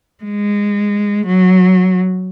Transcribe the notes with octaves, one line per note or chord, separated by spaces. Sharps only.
G#3
F#3